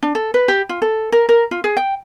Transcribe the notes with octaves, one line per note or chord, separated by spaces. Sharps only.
D4
A4
B4
G4
F4
A4
A#4
A#4
F4
G#4
G5